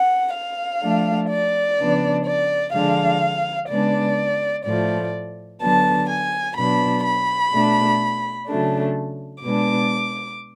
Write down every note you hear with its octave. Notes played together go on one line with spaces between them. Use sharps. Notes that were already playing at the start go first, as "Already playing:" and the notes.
Already playing: F#5
F5
F3 A3 D4
D5
C#3 F3 B3 D4
D5
D3 F3 G#3 D4 F5
C#3 G#3 B3 D4 D5
A2 F3 A3 D5
D3 F#3 B3 D4 A5
G#5
B2 F#3 B3 D4 B5
B5
B2 A3 D4
C#3 F#3 A3 D4
B2 G#3 B3 D4 D6